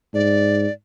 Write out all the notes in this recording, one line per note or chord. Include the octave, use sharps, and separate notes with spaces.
G#2 D5